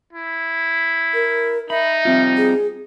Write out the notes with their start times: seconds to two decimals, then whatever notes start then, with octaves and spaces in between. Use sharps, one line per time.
0.13 E4
1.14 A#4
1.70 D#4 E5 B5
2.05 G3 C4 F4
2.37 G#4